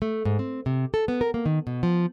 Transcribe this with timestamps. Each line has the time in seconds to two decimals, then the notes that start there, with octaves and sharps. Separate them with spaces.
0.02 A3
0.25 G#2
0.39 C4
0.66 C3
0.94 A4
1.08 B3
1.21 A#4
1.34 A#3
1.46 D#3
1.67 B2
1.83 F3